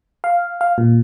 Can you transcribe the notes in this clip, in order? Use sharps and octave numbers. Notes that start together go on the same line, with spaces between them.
F5
F5
A#2